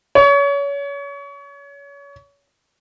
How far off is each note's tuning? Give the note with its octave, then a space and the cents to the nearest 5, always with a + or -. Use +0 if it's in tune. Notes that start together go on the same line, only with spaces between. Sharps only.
C#5 +30